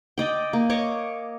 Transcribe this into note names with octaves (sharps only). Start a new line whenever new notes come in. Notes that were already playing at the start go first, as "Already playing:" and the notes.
D5 D#5 G5
A#3
C#5 D#5 C#6 D6